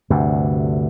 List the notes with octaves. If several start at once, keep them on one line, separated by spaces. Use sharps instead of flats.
D2 G2 C3